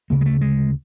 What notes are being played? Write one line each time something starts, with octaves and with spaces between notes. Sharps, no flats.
D2 C#3 A#3
G#3
A3
G#3